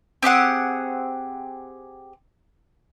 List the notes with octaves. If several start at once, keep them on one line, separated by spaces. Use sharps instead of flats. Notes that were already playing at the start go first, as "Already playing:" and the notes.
C4 G4 G#4 F#5